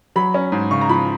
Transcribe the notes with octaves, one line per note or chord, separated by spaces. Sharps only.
F#3 B5
C#4
G#2
C#3 C#6
A#5
F3 B5